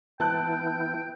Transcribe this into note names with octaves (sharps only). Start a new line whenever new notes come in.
E3 B3 E4 G5 A5 F#6